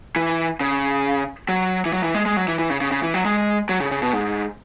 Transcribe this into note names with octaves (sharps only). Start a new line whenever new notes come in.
E3
C#3
F#3
E3
F#3
E3
G#3
G#3
F#3
E3
E3
C#3
C#3
C#3
E3
F#3
G#3
F#3
C#3
C#3
B2
G#2